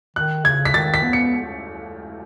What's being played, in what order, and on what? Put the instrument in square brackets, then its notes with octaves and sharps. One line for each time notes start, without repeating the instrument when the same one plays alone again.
[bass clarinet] D#3 [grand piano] F#6
[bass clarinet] C#3 [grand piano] G#6
[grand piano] B6
[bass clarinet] D#3 [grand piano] A6
[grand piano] B6
[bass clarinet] B3
[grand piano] C#7